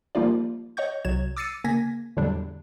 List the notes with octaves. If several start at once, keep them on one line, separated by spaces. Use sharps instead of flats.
F3 G3 A#3 D#4 F4 D5
C#5 D#5 F#5 C#6 G6
C2 F#3 G#6 E7
D6 E6 A6 C7 C#7 D#7
C#3 A#3 G#5 G#6 A#6 B6
E2 A2 D3 F#3 G3 D4